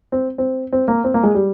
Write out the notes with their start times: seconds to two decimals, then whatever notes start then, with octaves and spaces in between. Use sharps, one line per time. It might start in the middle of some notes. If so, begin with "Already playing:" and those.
0.12 C4
0.38 C4
0.72 C4
0.88 A#3
1.04 C4
1.14 A#3
1.23 G#3
1.35 G3